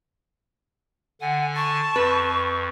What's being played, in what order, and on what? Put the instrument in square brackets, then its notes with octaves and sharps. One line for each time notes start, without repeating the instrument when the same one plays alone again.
[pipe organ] D3 G#5 [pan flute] F#5
[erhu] A5 [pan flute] C#6
[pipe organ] F2 [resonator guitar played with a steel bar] B4